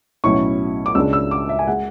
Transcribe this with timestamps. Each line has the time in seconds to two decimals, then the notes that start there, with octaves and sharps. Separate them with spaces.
0.24 B1 A2 F#3 C#4 E4 C#6
0.86 D6
0.95 C#2 C#3 G#3 D4 E6
1.13 E6
1.31 D6
1.49 E5
1.59 G#5
1.67 G#3 F#5